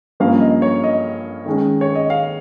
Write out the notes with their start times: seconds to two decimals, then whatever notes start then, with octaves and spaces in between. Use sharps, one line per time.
0.20 G2 F3 A#3 C#4 F5
0.40 D#5
0.62 C#5
0.84 D#5
1.46 D#3 G#3 C#4
1.81 C#5
1.95 D#5
2.10 F5